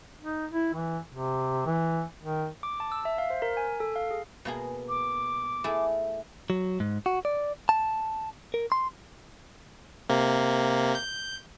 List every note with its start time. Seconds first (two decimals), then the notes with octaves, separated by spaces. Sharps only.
0.20 D#4
0.51 E4
0.74 E3
1.10 C3
1.66 E3
2.21 D#3
2.63 D6
2.80 A5
2.92 E6
3.05 E5
3.18 F5
3.30 C5
3.42 A#4
3.57 G#5
3.80 A4
3.96 F5
4.11 G#4
4.45 B2 A#3 G#4
4.89 D6
5.64 A3 E4 G#4
6.50 F#3
6.80 G#2
7.06 F#4
7.25 D5
7.69 A5
8.54 A#4
8.72 C6
10.09 C3 A#3
10.95 G6